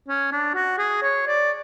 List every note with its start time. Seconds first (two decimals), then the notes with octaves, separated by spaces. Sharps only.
0.09 C#4
0.32 D4
0.55 F#4
0.79 G#4
1.03 C#5
1.27 D5